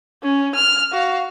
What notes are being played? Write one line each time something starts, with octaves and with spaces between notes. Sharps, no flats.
C#4
F6
F#4 F5